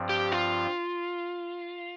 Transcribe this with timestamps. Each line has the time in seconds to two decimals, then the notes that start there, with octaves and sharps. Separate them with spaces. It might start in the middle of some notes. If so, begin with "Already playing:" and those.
Already playing: G2 F3 C4
0.09 G4
0.32 F4